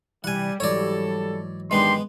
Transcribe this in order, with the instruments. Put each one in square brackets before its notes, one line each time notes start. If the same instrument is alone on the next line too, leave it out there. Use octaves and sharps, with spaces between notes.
[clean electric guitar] C2 E3 [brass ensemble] G3 [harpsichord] F#5 G#5
[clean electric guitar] G#2 E3 F#3 [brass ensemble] G3 A4 [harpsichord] C#5 D5
[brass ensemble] D#3 D4 G4 [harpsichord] G#3 B3 [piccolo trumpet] C6